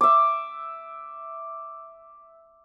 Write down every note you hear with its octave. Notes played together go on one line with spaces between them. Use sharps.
E5 D6